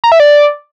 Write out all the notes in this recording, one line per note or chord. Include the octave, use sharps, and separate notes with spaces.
A#5
E5
D5